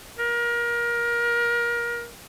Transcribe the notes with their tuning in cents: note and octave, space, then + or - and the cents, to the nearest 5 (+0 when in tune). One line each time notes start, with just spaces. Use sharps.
A#4 +25